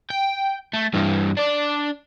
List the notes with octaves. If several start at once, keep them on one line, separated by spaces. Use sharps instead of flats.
G5
A3
G2 E3
D4 D5